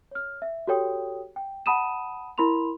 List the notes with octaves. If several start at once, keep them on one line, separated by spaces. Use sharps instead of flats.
C#5 F6
E5
F#4 G4 A4 C#5 G5 D#6
G5
F#5 A5 B5 D#6 D#7 E7
E4 A#4 B5 C6 F7